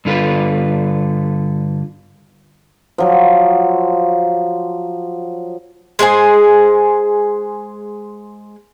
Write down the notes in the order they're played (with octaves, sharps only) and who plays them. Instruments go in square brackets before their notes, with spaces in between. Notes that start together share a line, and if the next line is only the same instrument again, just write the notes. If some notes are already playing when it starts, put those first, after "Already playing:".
[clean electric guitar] G2 D3 F4 B4
[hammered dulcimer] F3 F#3
[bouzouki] G#3 G#4 C5 G#5